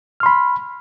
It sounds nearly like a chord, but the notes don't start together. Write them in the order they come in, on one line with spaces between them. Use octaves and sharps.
F6 C6 B5